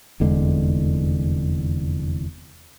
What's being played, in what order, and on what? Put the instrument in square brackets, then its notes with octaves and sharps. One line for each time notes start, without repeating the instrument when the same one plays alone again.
[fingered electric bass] F1 E2 D3 G#3